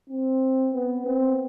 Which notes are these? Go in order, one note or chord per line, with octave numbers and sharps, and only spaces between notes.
C4
B3
C4